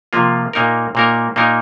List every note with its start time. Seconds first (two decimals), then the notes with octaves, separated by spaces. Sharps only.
0.13 C3 F3 A#3 F4
0.53 A#2 A#3 D#4 A#4
0.95 A#2 A#3 D#4 A#4
1.36 A#2 A#3 D#4 A#4